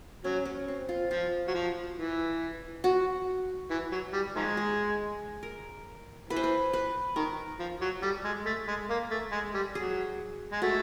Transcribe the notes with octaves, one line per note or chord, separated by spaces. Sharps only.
F#3 C#4
C#4
C4
F4
F3 F4
F#3
F3
E3
F#4
E3
F#3
G3
D#3 F3 G#3
G#4
A#4
E3 B4
C5
B4
B4
D#3 A#4
F3
F#3
G3 A4
G#3
A3
G#3
A#3
A3
G#3
G3
F#3 G#4
G#3
A3 F#4